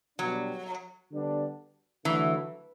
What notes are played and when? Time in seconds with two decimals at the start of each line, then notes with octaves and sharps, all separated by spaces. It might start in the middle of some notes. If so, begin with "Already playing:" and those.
0.19 B2 F#3 G3 D4
1.12 D3 G3 B3 D4
2.05 D3 E3 F#3 A3